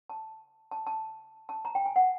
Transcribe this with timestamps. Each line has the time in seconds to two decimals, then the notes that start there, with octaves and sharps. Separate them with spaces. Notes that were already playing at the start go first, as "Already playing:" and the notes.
0.10 A5
0.71 A5
0.87 A5
1.49 A5
1.65 A#5
1.75 G5
1.85 G#5
1.96 F#5